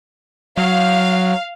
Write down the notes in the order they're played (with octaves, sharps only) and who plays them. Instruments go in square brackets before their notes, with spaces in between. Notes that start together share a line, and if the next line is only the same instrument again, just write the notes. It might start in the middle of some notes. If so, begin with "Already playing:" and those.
[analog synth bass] F#3 [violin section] F5